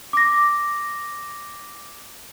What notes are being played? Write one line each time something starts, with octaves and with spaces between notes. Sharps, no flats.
D6 A#6